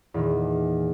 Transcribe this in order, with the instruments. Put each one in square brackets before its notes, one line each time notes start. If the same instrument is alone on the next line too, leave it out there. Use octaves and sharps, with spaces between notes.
[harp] E2 A#2 D#3